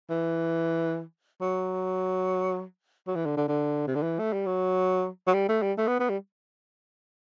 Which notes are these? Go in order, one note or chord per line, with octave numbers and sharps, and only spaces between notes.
E3
F#3
F#3
E3
D3
D3
D3
C3
D3
E3
A3
G3
F#3
F#3
G3
A3
G3
A3
B3
B3
G3